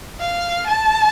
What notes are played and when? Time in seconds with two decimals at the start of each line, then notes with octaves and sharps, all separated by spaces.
0.20 F5
0.67 A5